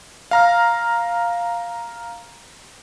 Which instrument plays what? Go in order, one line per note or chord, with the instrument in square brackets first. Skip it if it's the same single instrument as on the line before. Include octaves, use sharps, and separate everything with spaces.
[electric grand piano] F5 A#5 F6